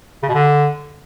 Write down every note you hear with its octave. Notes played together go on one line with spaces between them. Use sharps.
C#3
B2
D3